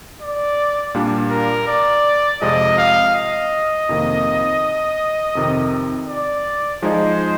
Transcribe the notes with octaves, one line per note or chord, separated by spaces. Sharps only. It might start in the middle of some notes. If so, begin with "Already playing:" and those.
D5
A#2 G3 A#3 D4
A#4
D5
F2 C3 F3 G#3 D#5
F5
D#5
F2 C3 D#3 A#3
F2 C3 D#3
D5
F3 G#3 D#4 G#4 C5 D#5